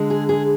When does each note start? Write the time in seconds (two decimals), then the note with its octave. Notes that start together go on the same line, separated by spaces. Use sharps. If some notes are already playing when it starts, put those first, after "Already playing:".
Already playing: D3 G#3
0.10 G#4
0.29 G#4